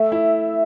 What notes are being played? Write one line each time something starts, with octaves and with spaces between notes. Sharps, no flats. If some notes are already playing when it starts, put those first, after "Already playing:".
Already playing: A3 E5
E4